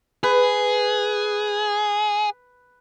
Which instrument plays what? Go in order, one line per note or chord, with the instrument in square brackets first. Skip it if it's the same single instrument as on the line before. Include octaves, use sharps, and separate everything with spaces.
[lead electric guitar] G#4 [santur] B4